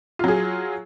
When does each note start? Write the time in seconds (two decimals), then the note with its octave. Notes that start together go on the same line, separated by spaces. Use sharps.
0.19 F4
0.24 F#3
0.28 G#4